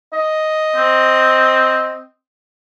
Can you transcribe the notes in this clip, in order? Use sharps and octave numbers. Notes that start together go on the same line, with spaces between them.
D#5
C4